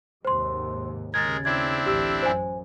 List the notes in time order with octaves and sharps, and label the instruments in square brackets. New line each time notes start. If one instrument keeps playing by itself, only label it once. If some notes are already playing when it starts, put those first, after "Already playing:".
[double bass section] D#2 G#2 C3 [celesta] C5 C6
[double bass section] D#2 C#3 [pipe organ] G#3 A#4 [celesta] G#6 A6
[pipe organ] C4 D4 E4 [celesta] G#6
[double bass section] A1 D2 [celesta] G4 E6
[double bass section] F#2 [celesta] C5 G#5